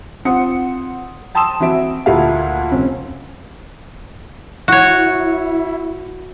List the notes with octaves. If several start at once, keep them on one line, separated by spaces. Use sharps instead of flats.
C4 F4 F#5 D#6 C#7
G5 A5 C6 D#6 E6 E7
E3 C4 F#4 E5 D7
D2 A#2 A3 E4 F5
F1 C4 C#4
E4 F#4 C#5